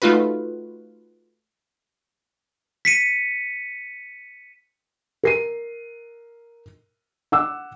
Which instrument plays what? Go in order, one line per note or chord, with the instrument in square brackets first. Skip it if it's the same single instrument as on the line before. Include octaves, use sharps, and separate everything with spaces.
[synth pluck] A3 D#4 F4 F#4 B4
[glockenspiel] B6 C#7 D#7
[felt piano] A#4 C7 D#7
F#5 D6 E6